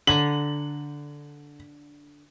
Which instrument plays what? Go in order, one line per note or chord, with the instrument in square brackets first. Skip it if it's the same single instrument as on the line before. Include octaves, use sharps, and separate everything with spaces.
[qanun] D3 G#5 A#5 [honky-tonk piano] F#7